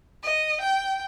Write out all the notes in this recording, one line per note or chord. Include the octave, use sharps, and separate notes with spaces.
D#5
G5